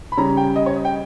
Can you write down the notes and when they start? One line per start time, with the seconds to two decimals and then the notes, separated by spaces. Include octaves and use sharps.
0.12 B5
0.17 C#3 G3 C#4 A#5
0.37 G5
0.56 D#5
0.66 C#5
0.76 D#5
0.85 G5